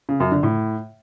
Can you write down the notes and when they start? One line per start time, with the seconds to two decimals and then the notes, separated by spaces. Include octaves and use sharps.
0.09 C#3
0.20 F#2
0.32 D3
0.43 A2